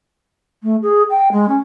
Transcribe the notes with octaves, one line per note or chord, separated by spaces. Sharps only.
A3
G#4
G5
G#3
C#4